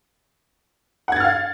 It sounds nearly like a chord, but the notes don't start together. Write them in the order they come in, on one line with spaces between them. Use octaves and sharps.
F#5 G#6 A6 F6 F5